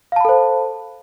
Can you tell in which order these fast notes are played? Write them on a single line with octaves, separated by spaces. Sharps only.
F5 A5 B5 A4 C5